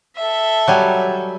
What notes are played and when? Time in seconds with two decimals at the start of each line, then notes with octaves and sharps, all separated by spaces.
0.17 A4 E5
0.68 F#3 G3 G#5